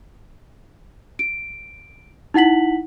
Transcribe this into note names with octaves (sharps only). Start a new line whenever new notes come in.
D7
D#4 E4 F#5 B6 F#7